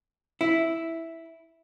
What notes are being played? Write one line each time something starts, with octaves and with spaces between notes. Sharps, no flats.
E4